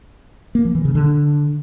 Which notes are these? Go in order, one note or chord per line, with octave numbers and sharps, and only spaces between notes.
A#3
F3
E3
C#3
D3